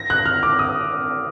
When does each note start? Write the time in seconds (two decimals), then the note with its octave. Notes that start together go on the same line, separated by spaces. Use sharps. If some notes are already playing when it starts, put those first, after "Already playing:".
Already playing: A#6
0.10 F#6
0.26 F6
0.43 D6
0.59 D#6